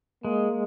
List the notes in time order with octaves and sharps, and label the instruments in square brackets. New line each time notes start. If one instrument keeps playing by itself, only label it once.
[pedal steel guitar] G#3 [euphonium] A#3